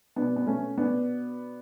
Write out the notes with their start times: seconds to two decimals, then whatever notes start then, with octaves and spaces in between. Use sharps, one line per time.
0.16 B2 B3 D4
0.36 B3
0.46 A3 C#4
0.77 B3 D4